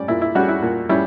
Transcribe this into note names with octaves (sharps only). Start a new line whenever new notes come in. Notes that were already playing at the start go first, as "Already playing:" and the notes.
Already playing: G3 C#4 D5
A#2 E4
E4
G3 C#4 F#4
E4
A#2
G3 C#4 E4